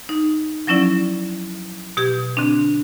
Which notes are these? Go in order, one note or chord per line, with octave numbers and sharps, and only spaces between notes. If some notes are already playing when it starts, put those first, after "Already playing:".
D#4
F3 F#3 C#4 E4 D5
B2 G4 G#6
D3 C4 D4